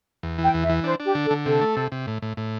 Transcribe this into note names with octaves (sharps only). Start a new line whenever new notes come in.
E2
E3 G5
E2
E5
E3
D4 C5
D4 G4
D3
A4
D3
C3 A4
A3
C3
C3
A2
A2
A2